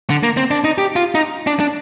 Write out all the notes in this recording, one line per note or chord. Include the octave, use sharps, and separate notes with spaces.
D3
A#3
C4
D4
D#4
G4
F4
D#4
D4
D4